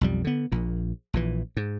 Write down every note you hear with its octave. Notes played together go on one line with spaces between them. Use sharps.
B1 F2 G3
D3 B3
A#1 A#2
A#1 A#2 E3
G#2